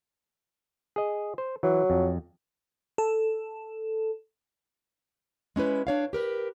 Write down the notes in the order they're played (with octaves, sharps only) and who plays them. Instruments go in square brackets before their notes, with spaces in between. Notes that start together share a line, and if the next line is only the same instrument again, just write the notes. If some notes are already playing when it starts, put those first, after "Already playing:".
[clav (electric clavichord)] G#4 D#5
C5
[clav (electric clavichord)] E3 [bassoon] F#3
[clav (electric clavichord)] F2
[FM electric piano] A4
[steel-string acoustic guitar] G#3 C#4 E4 B4
D4 C#5 F5
G4 A#4 B4